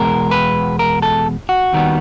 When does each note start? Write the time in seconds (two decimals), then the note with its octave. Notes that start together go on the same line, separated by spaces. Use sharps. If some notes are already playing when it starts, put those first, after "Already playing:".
Already playing: E2 B2 G#3 A#4
0.31 B4
0.79 A#4
1.02 A4
1.49 F#4
1.73 D#2 D#3 G3 B3